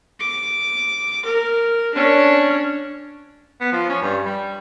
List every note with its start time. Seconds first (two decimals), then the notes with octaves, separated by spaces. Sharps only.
0.20 D6
1.25 A#4
1.94 C#4 D4
3.61 B3
3.72 F3
3.90 C#4
4.02 G2
4.26 G3